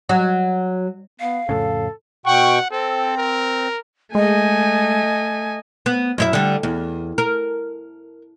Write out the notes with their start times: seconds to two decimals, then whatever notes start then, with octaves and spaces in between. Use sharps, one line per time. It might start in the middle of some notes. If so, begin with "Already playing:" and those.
0.09 F#3
1.20 B3 F5
1.49 F2 A2 C#3 A4
2.26 B2 F#5 G5 C#6
2.71 C4 A4
3.17 A#4
4.15 G#3 A3 D#5 G#5
5.86 B3
6.18 F#2 E4 E5
6.33 D3 G3
6.63 E2
7.18 A#4